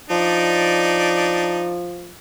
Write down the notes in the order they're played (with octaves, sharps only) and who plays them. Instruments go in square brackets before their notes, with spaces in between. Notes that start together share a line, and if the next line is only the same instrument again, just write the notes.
[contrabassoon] F3 [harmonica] D4 D#4 D5